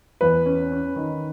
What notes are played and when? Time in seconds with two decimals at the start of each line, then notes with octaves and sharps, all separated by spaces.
0.21 E2 B4
0.46 C#4
0.72 C#4
0.96 D#3